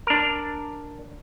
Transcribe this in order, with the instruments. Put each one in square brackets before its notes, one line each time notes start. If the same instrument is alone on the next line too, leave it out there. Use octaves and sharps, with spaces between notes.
[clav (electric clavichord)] D4 A#4